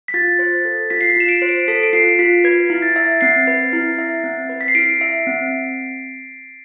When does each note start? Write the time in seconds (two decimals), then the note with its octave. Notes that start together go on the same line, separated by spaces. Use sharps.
0.08 B6
0.14 F4 A6
0.39 C5
0.65 A4
0.90 F4 B6
1.01 C7
1.10 B6
1.16 F4 E7
1.29 D7
1.42 C5
1.49 D7
1.68 A4 B6
1.83 D7
1.93 F4 C7
2.19 F4 B6
2.44 B4 G#6
2.70 E4
2.82 A6
2.96 E5
3.21 C4 C7
3.47 B4
3.73 E4
3.98 E5
4.24 C4
4.50 B4
4.61 B6
4.68 C7
4.75 E4 D7
5.01 E5
5.27 C4